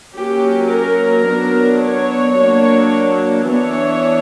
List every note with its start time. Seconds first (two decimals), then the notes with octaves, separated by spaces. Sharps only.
0.17 F#3 A#3 C#4 G4
0.72 A#4
1.27 F#3 B3 D4
1.82 C#5
2.37 F#3 A#3 D4
3.47 E3 B3 D4 C#5